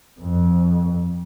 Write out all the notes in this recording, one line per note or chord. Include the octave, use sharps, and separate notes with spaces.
F2